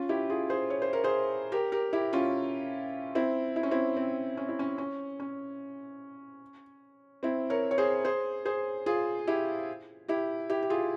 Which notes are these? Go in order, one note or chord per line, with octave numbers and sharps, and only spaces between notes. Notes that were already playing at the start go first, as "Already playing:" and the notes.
Already playing: C#4 F4
E4 G4
F4 G#4
G#4 C5
C#5
C5
A#4
G#4 C5
G4 A#4
G4 A#4
E4 G4
C#4 F4
C4 E4
E4
C#4
C4 E4
C4
C#4
E4
C#4
C#4
C#4
C4 E4
A#4 C#5
C#5
G#4 C5
G#4 C5
G#4 C5
F4 G#4
E4 G4
E4 G4
E4 G4
G4
F4 G#4